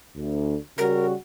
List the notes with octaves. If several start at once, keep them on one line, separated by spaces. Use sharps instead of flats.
D2
C#3 G3 F#4 A#4